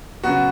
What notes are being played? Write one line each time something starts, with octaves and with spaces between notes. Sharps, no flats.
C#3 F#3 B3 F#4